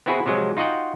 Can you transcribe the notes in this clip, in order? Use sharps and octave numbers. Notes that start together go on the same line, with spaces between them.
B3 C4 E4 F#4 G#4 B4
C3 F3 F#3 G#3
D#4 F4 F#4 D#5 F#5 G5